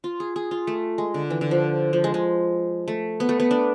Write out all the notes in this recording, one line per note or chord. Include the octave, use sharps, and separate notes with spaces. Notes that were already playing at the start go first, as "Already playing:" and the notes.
F4
G#4
G#4
F4
A3
G#3
D3
E3
D3
F3
F3
G#3
G#3
A3
B3
A3
B3
D4